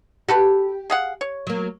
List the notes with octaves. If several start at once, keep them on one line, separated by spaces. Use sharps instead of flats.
F#4 G4 A4 B4
G#4 F5 F#5
C#5
F#3 A#3